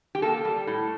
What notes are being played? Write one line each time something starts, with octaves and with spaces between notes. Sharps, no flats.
G4
A#3 A4
G3
A2